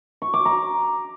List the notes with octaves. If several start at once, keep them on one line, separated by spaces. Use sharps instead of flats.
C#6
D6
A#5